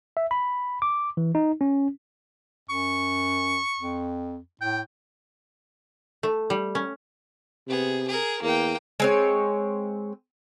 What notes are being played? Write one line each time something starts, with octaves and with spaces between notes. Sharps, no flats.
E5
B5
D6
E3
D#4
C#4
F#2 C#6
F2
A2 G5
A3
G3
C#4
C3 B3 G#4
G#4 A#4
E2 A#3 G5
G#3 C4 C#5